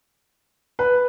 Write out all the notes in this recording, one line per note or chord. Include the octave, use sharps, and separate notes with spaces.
B4